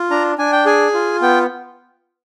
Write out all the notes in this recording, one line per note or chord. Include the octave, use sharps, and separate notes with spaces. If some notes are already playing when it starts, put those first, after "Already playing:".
Already playing: F4
D4 A#5
D4 G#5
G5
G#4 G#5
F4
B3 G5